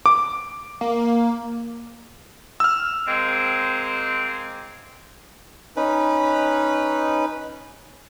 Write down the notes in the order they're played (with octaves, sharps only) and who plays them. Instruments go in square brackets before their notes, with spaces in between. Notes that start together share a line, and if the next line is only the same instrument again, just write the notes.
[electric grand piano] D6
[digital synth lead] A#3
[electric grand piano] E6 F6
[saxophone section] G#3 A#3 C4
[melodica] C#4 D#4 B4